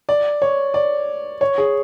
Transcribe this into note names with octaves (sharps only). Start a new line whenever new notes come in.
D5
C#5
D5
C#5
G#4